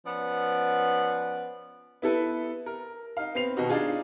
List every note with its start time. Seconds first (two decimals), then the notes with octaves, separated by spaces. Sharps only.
0.05 F3 B3 C#4 D5
2.02 B3 E4 A4 B4
2.66 A#4
3.17 D#4 F5
3.35 B3 C4 C7 F7
3.57 B2 D#3 D#4 F#4
3.69 D4 D#4 F4 G#4